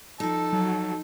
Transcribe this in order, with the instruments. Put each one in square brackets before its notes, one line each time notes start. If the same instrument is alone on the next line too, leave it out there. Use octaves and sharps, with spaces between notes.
[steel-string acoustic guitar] F3 D#4 [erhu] A4
[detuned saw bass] F#3